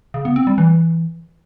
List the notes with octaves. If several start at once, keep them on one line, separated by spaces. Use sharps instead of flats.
C#3
B3
C4
G3
E3